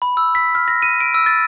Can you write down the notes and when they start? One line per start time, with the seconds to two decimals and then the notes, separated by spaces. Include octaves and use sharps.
0.02 B5
0.17 E6
0.35 B6
0.55 F6
0.68 A#6
0.82 D#7
1.00 D7
1.14 E6
1.26 A6